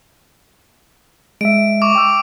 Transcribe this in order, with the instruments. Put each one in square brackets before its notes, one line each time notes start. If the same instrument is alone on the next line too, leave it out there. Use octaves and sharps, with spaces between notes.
[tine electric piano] G#3 E5 [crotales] D7
[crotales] C#6 D6
[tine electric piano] G5 E6